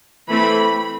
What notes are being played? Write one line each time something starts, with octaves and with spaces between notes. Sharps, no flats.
E3 A3 C4 B5